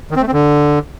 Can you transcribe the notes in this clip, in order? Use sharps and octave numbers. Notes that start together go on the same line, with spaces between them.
D#3
C4
A3
C4
D3